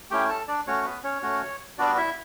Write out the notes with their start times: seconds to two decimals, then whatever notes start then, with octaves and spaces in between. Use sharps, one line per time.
0.11 A3 C#4 E4 G4 G5
0.29 A4 A5
0.48 D4 D5
0.67 A3 C#4 F#4 C#5
0.85 B3 B4
1.03 C#4 C#5
1.22 A3 C#4 F#4
1.78 G3 B3 D4 F#4 D5
1.97 E4 E5